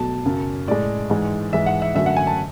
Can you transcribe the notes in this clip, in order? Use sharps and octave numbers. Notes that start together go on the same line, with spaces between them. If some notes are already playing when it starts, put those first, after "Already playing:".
Already playing: B2 F#3 A3 A5
F#2 C#3 F#3
A2 G#3 D5
G#2 E3 G#3
G#2 E3 G#3 E5
F#5
E5
F#2 D3 F#3 A3 E5
F#5
G#5
A5